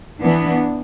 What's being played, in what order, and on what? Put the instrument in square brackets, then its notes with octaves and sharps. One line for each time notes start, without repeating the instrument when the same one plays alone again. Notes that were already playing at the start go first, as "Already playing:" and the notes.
[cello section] E3 B3 D4